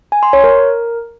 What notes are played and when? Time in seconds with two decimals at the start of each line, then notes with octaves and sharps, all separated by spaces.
0.12 G#5
0.23 C6
0.33 C#5
0.44 A#4